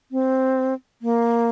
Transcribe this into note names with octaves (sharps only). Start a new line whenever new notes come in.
C4
A#3